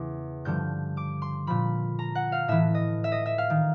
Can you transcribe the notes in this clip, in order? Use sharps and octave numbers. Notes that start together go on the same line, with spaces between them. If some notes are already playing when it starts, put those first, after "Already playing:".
Already playing: E2 C#3 E3 D6
G2 D3 F3 G6
D6
C6
A#2 F3 B5
A#5
F#5
F5
A2 E3 E5
D#5
E5
D#5
E5
F5
D#3